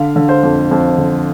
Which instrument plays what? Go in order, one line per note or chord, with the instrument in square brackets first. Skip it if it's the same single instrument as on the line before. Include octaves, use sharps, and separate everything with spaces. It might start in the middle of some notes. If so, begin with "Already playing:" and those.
Already playing: [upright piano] D3 F5
D3
C5
F2
F2
D3